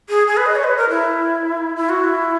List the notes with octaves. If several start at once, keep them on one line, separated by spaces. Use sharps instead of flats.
G#4
G#4
B4
D#5
C#5
B4
A#4
E4
E4
F#4
E4